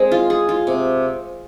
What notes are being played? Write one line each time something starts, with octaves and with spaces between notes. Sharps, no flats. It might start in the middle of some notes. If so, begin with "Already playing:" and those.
Already playing: G#3 C4 G#4
F4
G#4
F4
C3